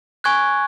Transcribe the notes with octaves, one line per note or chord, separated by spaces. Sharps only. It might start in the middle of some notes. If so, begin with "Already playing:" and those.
G#5 C#6 F#6 G#6